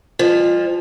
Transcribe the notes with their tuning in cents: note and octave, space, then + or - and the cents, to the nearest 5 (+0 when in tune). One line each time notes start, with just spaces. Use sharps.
F3 +0 G#3 -45